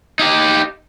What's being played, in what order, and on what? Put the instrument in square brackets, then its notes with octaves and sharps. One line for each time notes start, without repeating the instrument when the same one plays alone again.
[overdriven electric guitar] D#4 G4